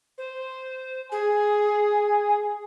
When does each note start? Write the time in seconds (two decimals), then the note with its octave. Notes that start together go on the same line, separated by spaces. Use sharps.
0.18 C5
1.12 G#4 G#5